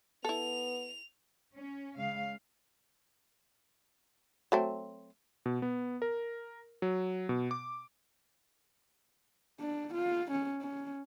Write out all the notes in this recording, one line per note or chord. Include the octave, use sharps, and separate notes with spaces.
B3 E4 A4 F7
C#4
C#3 G#3 F5
F#3 A3 C4
B2
B3
A#4
F#3
B2
D6
D4
F4
C#4
C#4